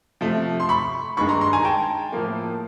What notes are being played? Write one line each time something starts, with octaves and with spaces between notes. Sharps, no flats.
C3 F3 A3
C6
B5 C#6
G2 D#3 G#3 B5 C#6
A#5 C6
A#5 C6
G#5 A#5
G5 A5
A2 F3 A#3